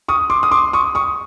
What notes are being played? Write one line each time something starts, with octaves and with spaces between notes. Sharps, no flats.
C#6 D#6
C6 D6
D#6
C6 D6
C#6 D#6
C#6 D#6